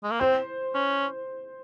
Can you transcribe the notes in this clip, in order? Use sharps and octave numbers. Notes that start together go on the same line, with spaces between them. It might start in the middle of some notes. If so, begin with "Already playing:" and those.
G#3
A#3
C4 C5
C#4